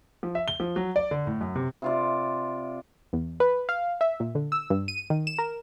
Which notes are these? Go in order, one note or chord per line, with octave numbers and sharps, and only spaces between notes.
F3
E5
G7
F3
F#3
D5
D3
A2
F#2
C3
C3 F4 D5
E2
B4
F5
E5
A#2
D3
E6
G2
D#7
D#3
E7
A#4